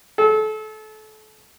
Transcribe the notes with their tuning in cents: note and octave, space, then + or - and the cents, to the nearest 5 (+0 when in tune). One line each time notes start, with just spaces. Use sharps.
A4 -30